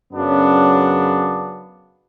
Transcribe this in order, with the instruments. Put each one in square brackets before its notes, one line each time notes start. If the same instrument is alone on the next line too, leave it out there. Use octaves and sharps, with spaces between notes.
[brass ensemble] F#2 C#3 F#3 B3 D4